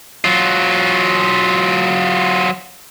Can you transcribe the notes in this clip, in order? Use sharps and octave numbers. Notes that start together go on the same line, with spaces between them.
F#3 F4